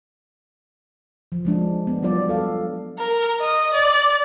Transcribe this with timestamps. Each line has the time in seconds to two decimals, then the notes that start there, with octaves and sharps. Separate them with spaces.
1.32 F3
1.45 F3 G#3 D4
1.87 B3
2.03 F#3 G3 F4 D5
2.29 A4 F5
2.99 A#4
3.40 D#5
3.73 D5